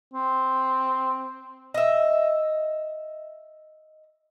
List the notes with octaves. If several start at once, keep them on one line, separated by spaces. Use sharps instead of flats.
C4
D#5 E5